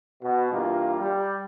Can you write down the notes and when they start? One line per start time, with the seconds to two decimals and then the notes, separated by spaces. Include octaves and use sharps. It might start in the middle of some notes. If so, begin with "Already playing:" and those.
0.23 B2
0.52 G2 E3 A#3 F4
1.00 G3